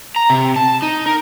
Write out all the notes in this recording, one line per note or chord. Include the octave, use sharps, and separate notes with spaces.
A#5
C3
A5
D#4
A#4